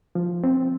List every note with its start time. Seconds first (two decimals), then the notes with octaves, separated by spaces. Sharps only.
0.15 F3
0.44 C4